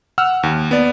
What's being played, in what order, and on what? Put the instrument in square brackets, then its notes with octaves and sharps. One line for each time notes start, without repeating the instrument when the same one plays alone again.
[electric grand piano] F#5 E6 F6
D#2
B3 D5